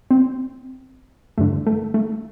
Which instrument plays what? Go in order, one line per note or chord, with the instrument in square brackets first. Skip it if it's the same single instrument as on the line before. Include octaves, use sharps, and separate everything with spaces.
[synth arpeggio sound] C4
G2 D3 A3
A3
A3